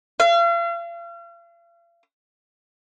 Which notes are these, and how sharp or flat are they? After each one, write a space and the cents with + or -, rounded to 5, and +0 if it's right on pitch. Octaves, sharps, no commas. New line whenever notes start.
F5 -40